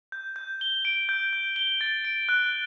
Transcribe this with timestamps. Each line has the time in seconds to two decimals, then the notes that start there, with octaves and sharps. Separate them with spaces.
0.12 G6
0.36 G6
0.61 G7
0.85 D7
1.09 G6
1.33 G6
1.56 G7
1.81 A6
2.05 D7
2.29 F#6